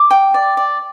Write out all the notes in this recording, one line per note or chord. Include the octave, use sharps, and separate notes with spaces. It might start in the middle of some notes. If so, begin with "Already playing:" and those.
Already playing: D6
G5
D5
D5